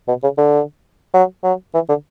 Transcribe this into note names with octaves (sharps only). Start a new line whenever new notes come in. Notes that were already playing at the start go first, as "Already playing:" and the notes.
B2
C#3
D3
F#3
F#3
E3
D3